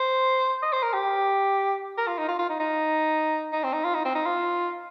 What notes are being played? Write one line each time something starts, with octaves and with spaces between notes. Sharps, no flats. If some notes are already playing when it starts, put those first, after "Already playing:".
Already playing: C5
D#5
C5
A#4
G4
A#4
F4
D#4
F4
F4
D#4
D#4
D#4
C4
D#4
F4
D#4
C4
D#4
F4